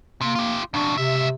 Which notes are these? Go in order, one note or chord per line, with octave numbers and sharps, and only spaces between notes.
C3 A#3
F4 G4
F2 B2 D4
C#2 C3 E5